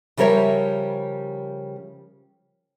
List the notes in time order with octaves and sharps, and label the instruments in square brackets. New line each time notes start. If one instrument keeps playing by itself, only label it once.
[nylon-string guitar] C#3 F3 G3 A#4 C#5 E5